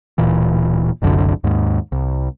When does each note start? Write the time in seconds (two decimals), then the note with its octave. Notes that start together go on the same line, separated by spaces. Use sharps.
0.18 D1 A#2 E3
1.02 F#1 C2 F#2 D3
1.44 D#2 G#2
1.92 C2